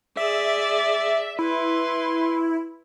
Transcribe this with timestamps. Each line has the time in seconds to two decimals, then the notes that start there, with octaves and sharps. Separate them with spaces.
0.17 G#4 D5 E5
1.39 E4 B4 C6